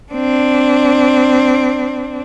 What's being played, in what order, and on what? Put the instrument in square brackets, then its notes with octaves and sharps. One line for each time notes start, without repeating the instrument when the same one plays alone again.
[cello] C4 D4